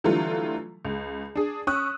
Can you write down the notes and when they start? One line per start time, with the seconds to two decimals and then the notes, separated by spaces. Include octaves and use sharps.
0.04 D3 E3 F#3 G3 A3 F4
0.85 C#2
1.35 D4 G#4
1.67 C#4 C#6 D#6 E6 F#6